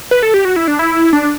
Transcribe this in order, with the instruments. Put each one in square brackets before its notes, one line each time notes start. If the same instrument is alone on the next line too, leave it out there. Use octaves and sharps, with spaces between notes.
[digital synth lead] B4
A4
G4
F#4
E4
D4
E4
D4